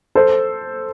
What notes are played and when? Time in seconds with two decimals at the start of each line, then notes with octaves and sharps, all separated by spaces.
0.15 A4 C5